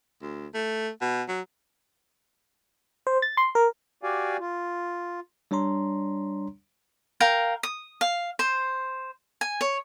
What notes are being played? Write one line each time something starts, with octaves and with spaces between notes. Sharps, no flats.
D2
A3
B2
F#3
C5
A6
C6
A#4
F#4 G4 D5 F5 G#5
F4
G3 D4 C#5 A#5 C6
A#4 F5 G5
D#6
F5
C5
G#5
C#5